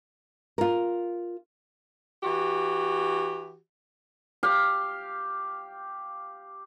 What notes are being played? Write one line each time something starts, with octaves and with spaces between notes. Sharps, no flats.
F4 A#4
E3 F#4 G4
G4 F5